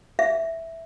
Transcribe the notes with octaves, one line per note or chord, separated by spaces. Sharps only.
E5